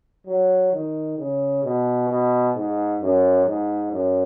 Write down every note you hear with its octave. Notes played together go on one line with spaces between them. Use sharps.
F#3
D#3
C#3
B2
B2
G#2
F#2
G#2
F#2